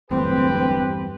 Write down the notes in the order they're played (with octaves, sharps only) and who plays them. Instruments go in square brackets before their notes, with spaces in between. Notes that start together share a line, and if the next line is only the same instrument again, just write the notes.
[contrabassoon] D1 [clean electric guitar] E2 G2 [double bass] C4 [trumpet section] G4 B4